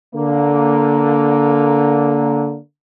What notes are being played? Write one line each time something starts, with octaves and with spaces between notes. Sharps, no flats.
D3 A#3